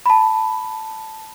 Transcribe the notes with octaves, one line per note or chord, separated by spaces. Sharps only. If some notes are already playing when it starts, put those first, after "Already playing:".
A5 B5